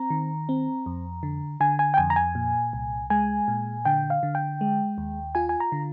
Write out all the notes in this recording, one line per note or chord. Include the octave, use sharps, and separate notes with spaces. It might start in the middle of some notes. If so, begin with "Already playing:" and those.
Already playing: C4 A#5
D#3
C4
F2
D3
D3 G#5
G#5
G5
F2 G#5
A#5
G#5
A#2
C2
G#3 G#5
A#2
D3 G5
F5
D3
G5
G#3
D#2
F4 G#5
G#5
A#5
D3